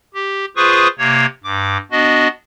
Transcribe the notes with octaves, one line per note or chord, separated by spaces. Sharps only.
G4
F4 G#4 B4 C5 C#6 D#6
C3 A#3 C#5
G2 D6
B3 D4 F#4 D#5